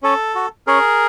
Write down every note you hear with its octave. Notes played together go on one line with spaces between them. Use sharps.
C#4 A4
F#4
C#4 G#4 A#4